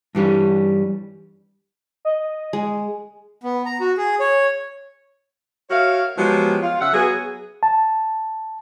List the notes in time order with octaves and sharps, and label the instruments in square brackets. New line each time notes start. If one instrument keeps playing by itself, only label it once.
[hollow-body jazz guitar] G2 E3 G3 C#4
[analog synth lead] D#5
[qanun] G#3
[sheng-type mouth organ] B3
A#5
F#4
G#4
C#5
[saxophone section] F#4 A#4 C#5 E5 F5
F3 F#3 G#3 B3 G4
F4
C#3 E5 F#5
F#3 B3 G#4
[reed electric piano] A5